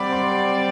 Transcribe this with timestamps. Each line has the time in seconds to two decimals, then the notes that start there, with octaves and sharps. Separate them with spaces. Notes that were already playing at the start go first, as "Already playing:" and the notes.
Already playing: G3 C4 G4 D5 F#5 B5
0.12 C6